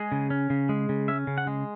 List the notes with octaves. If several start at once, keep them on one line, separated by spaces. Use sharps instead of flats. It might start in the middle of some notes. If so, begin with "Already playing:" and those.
Already playing: G#3 G#4
C#3
C#4
C#3
G#3
C#3
C#4 E5
C#3
F#5
G#3